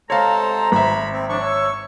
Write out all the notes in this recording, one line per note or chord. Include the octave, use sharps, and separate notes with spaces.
C3 G#3 A4 C5 C#5 F5 A#5
G#1 E5 B5
C4
A2 F3 D4 C#6
C#5 E6